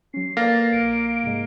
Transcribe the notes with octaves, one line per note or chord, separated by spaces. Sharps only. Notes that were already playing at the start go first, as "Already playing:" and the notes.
F#3 C#4 C7
A#3 A4 B4 D5 F5 A6 A#6
A#1 D7
G#2 C3 G#3